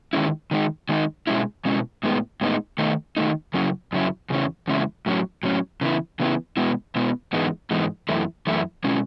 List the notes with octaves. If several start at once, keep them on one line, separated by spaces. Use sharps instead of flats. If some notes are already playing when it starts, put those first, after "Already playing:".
D#3 G#3 C#4 E4
D#3 G#3 D#4
D#3 G#3 D#4
B2 G#3 C#4 E4
B2 G#3 C#4 E4
A2 G#3 B3 D#4
A2 G#3 B3 D#4
D#3 A3 D#4
D#3 A3 D#4
F#2 C#3 F#3 C#4 E4
F#2 C#3 F#3 C#4 E4
E2 C#3 G#3 C#4 E4
E2 C#3 G#3 C#4 E4
A2 F#3 C#4
A2 F#3 C#4
C#3 E3 B3 E4
C#3 E3 B3 E4
B2 G#3 B3 E4
B2 G#3 B3 E4
G#2 E3 G#3 B3 D#4
G#2 E3 G#3 B3 D#4
F#2 E3 A3 E4
F#2 E3 A3 E4
B2 G#3 C#4 E4